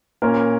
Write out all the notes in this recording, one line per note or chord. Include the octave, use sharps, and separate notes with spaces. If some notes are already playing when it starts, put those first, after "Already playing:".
A#2 A#3 C#4 A#4